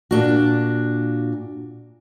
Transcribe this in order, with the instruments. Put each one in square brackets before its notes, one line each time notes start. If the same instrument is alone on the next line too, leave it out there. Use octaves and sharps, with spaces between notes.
[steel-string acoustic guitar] A#2 D4 F#4